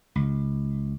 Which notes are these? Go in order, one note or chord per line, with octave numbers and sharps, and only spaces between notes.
C#2